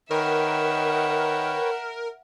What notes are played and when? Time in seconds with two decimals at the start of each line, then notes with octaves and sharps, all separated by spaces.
0.11 D#3 A#4 B4 C#5 E5 F#5 G5